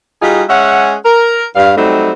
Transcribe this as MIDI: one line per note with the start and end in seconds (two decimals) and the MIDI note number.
0.22 0.43 55
0.22 0.43 63
0.22 0.43 65
0.22 0.43 66
0.22 0.43 68
0.49 0.95 56
0.49 0.95 61
0.49 0.95 76
0.49 0.95 78
1.05 1.45 70
1.56 1.76 43
1.56 1.76 77
1.77 2.12 54
1.77 2.12 55
1.77 2.12 57
1.77 2.12 60
1.77 2.12 63